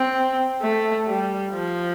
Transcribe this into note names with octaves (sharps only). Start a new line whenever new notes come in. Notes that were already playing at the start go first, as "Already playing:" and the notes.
Already playing: C4
A3
G3
F3